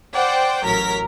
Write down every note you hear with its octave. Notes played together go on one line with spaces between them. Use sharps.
C5 D5 F#5 G5
A1 F#3 A#4 A#5 B6